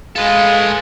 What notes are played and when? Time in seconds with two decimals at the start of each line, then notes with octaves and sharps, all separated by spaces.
0.16 G#3 A4 B4 F5